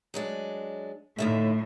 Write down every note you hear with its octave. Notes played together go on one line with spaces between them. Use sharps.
F#3 G#3 D4
D#2 A2 D3 E5